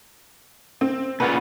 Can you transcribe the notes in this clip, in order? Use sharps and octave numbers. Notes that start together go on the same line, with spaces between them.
C4
A#2 C#3 F4 B4 F#5